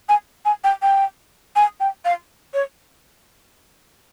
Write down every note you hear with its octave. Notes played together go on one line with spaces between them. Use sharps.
G#5
G#5
G5
G5
G#5
G5
F5
C#5